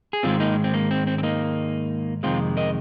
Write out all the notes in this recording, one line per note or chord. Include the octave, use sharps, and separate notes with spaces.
G#4
G#2 D#3 G#3 C4 F4
A#3 D#4
C4
A#3
C4
C4
C4
A#3 D#4
F2 C3 D#3 G#3 C4 F4
A#4 D#5